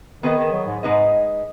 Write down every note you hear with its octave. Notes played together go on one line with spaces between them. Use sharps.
D#3 B3 G#4 B4 D#5
D#3
F#3
G#2
G#2 G#3 D#4 B4 D#5